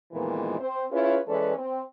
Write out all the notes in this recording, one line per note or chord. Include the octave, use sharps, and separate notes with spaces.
F2 A#2 D#3 E3 G#3 B3
C4 C5
C#4 E4 F4 G#4 B4 C#5
E3 G#3 C#4 A4 B4 D5
C4